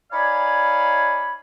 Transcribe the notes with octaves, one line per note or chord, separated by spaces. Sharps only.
D#4 C#5 D5 F5 G#5 B5